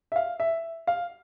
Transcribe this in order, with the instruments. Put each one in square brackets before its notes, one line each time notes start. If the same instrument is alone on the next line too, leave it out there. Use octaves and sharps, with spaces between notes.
[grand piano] E5
F5
E5
F5